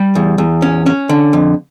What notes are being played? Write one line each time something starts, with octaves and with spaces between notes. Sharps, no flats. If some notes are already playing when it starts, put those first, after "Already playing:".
Already playing: G3
E2
E2
C#4
C#4
D3
F2